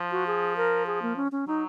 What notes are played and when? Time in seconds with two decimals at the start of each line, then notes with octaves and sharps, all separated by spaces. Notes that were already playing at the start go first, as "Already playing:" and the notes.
Already playing: F3
0.11 F#4
0.27 G#4
0.57 A#4
0.86 G#4
1.02 A#3
1.16 C#4
1.32 C#4
1.48 F#3 D#4